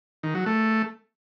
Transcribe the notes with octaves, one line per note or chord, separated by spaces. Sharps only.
D#3
F#3
A3